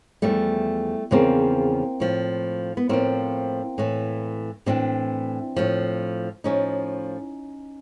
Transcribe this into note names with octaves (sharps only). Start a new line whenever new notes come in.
E2 C#3 F3 G3 A3
E2 C#3 F3 A#3 C4
A2 F3
B3
A2 F3 A#3 C4
A2 E3
A2 E3 C4 D4
A2 F3
A2 F3 C#4 D#4